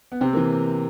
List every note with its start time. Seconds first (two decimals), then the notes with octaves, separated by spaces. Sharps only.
0.12 B3
0.21 C3 C4
0.33 A#3
0.36 E3